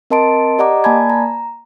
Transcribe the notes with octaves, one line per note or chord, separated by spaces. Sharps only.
C4 A#4 D#5 A5 C6 D7
G4 D5 D#5 F#5 A#5 D6
A#3 D5 G#5 A5 B5 G#6
A#5